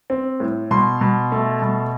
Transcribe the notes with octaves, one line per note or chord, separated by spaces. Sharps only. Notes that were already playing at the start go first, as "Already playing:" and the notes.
C4
A2
B2 C6
B2
A3
B2